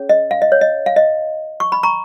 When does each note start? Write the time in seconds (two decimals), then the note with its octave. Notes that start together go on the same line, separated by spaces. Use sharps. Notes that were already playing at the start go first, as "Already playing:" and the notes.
Already playing: C#4 G#4 C#5
0.09 D#5
0.31 F5
0.42 D#5
0.52 C#5
0.61 D#5
0.86 F5
0.96 D#5
1.60 C#6
1.72 B5
1.83 A#5 C#6